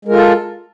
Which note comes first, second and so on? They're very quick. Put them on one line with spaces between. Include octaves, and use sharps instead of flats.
G#3 A#4 F4 A4